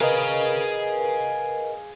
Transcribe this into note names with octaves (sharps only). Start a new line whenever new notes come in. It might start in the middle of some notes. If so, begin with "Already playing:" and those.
G#4 A#4 B4 D#5 F5